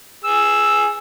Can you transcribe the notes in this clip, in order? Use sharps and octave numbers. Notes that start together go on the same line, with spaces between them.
G#4 E6